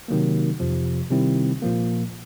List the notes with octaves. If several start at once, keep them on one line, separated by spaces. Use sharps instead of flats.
C3 D#3 F#3 A#3
F2 C3 F3
C3 D#3 G3 C4 E4
A#2 F3 A#3